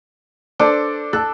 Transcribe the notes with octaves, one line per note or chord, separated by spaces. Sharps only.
D4 A4 C5
A4 F#6